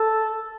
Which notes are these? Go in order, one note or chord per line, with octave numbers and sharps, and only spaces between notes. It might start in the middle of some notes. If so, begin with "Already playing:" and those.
Already playing: A4